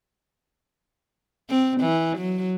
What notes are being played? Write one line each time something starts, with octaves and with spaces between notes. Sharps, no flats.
C4
E3
F#3